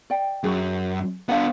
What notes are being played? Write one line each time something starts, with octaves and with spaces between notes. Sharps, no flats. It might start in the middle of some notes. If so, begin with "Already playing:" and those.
D5 G5
F#2 G#4
B3 D4 B4 F5 F#5